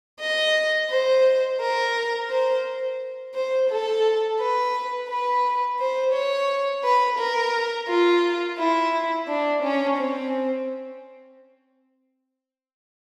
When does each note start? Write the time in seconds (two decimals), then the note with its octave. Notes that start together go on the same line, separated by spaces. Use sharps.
0.20 D#5
0.90 C5
1.61 A#4
2.30 C5
3.35 C5
3.70 A4
4.40 B4
5.09 B4
5.79 C5
6.13 C#5
6.84 B4
7.19 A#4
7.89 F4
8.58 E4
9.28 D4
9.62 C#4
9.98 C4